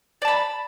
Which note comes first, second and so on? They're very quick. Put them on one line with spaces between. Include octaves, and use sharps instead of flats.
D5 A5 B5